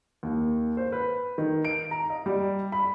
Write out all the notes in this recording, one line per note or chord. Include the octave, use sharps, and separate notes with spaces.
D#2
C5
B4
D#3
D7
A#5
D#5
G3
B5